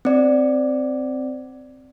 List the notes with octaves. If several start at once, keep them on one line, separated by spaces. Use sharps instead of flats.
C4 D5